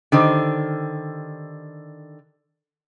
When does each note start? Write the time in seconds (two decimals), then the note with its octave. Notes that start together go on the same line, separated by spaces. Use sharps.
0.12 D3 D#3 G4 C5